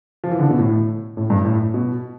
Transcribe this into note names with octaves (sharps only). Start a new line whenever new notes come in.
F3
E3
D3
B2
A2
A2
G2
A2
B2